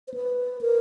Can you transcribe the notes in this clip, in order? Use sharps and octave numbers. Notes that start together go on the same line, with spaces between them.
C5
B4
A#4